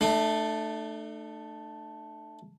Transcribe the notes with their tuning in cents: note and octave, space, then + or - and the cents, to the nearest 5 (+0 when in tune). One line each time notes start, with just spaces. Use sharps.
A3 +0 D4 +45